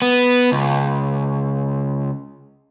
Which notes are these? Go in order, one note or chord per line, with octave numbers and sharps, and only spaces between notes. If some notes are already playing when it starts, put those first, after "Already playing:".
B3
C#2